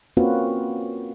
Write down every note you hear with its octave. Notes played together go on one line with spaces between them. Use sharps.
A#3 C4 C#4 F4 F#4 B4